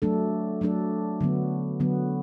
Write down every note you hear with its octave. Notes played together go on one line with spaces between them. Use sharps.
F#3 A3 D4 A4
F#3 A3 D4 A4
D3 F#3 B3
D3 F#3 B3